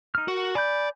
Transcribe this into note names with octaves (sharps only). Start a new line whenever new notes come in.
D#4 F6
F#4 A#4
D5 G#5 B5 G6